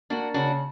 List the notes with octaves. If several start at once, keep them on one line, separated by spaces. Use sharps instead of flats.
A#3 D4 F#4
C#3 D4 F#4